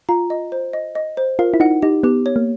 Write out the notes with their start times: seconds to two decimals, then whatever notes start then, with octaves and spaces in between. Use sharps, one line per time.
0.09 F4 A#5
0.30 D#5
0.52 C5
0.73 D#5
0.95 D#5
1.17 C5
1.39 F4 A#4
1.54 E4
1.60 D#4 F#5
1.82 D#4 G4
2.03 B3 G4
2.26 C#5
2.36 A#3